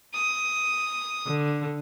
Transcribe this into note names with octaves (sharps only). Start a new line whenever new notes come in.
D#6
D3